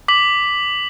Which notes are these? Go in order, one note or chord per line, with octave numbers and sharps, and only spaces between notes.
D6 B6 F#7